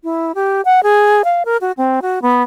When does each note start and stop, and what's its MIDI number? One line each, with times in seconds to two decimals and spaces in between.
0.04 0.32 64
0.35 0.61 67
0.65 0.83 78
0.83 1.22 68
1.24 1.43 77
1.45 1.57 70
1.61 1.72 66
1.77 2.00 60
2.02 2.22 66
2.22 2.42 59